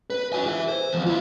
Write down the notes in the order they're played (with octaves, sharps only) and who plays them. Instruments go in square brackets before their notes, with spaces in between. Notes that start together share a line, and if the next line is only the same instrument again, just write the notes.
[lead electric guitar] B4
F#4 G#5
B4 E5
C5
E2 F3
E4 F4